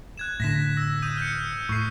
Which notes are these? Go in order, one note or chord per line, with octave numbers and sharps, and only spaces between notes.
F#6 G#6 E7
A2 D3 A#6 B6 E7
E6 A#6
D#6 G6 D#7
F6 G6 C#7
A2 C#6 C7